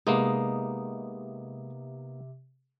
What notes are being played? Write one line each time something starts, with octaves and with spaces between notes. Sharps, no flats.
C3 G#3 A#3 B3 D#4